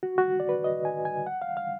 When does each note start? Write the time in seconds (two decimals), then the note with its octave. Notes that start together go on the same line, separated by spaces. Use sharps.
0.03 F#4
0.18 F#4
0.40 D5
0.49 B4
0.64 D#5
0.85 G#5
1.05 G#5
1.27 F#5
1.42 F5
1.57 F5